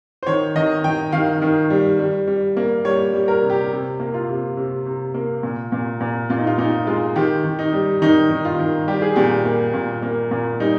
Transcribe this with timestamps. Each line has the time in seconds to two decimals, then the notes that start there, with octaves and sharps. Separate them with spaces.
0.23 C5
0.27 D#3 C#5
0.55 D#3 D#5
0.84 D#3 G5
1.12 D#3 F5
1.42 D#3
1.70 G3
1.99 G3
2.27 G3
2.57 A#3
2.85 G3 C#5
3.13 G3
3.28 A#4
3.43 C3
3.50 G4
3.71 C3
4.00 A#3
4.14 F4
4.29 C3
4.57 C3
4.86 C3
5.14 A#3
5.43 A#2
5.72 A#2
6.01 A#2
6.30 A#2 F4
6.38 D#4
6.47 F4
6.58 A#2 D#4
6.87 G#3 F4
7.16 D#3 G4
7.44 D#3
7.59 D#4
7.73 G3
8.02 D#3 D#4
8.30 D#3
8.45 F4
8.59 D#3
8.88 G3 G4
9.02 G#4
9.16 A#2 G4
9.45 A#3
9.74 A#2
10.03 A#3
10.31 A#2
10.60 G3 D#4